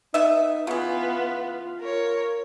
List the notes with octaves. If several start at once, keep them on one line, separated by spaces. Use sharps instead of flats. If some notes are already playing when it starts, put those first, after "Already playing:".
B3 D#4 E5
C#3 E3 B3 F4
A#4 C#5